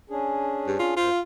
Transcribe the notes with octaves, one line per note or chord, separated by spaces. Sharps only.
C#4 D4 G#4
G2
F4
F#2 F4 C5
F5